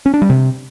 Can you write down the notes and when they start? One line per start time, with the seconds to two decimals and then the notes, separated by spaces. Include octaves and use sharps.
0.06 C#4
0.14 D4
0.22 G3
0.30 C3